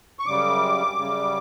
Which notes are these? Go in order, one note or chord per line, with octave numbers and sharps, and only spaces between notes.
C#6
F#2 C#3 G3 D6
F#2 C#3 G3